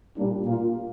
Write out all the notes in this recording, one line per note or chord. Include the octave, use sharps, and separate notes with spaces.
A#2 G3 A#3 D4
A#2 A#3 F4